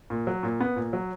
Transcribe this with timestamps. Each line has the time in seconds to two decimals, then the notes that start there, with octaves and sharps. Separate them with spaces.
0.10 A#2
0.27 F#3
0.43 A#2
0.60 B3
0.76 A#2
0.93 F#3